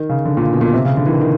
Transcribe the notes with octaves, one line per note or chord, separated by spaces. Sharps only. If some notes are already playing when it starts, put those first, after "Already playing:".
Already playing: D#3
C#3
D3
A#2
B2
A#2
C3
C#3
D3
E3
D#3
D#3